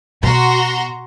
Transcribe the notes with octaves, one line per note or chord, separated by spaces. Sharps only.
B2 F#4 A#5 C6